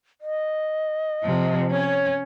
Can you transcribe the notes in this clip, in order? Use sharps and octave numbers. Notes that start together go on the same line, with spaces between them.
D#5
C3 F3
C#4 C#5